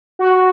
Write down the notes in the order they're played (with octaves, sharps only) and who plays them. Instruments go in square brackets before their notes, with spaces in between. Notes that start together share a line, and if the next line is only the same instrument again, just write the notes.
[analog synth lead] F#4